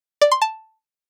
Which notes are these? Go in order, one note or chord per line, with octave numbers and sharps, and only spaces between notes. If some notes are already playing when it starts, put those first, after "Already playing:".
D5
C6
A5